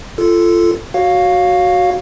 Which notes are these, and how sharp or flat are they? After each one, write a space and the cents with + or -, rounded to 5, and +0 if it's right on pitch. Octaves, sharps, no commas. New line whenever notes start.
F4 -20 A4 +0
F#4 +0 C#5 +0 F5 +15